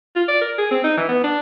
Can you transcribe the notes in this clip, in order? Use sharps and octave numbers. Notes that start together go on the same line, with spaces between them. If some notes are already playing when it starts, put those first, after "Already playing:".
F4
D5
A#4
G#4
C4
D#4
E3
B3
D4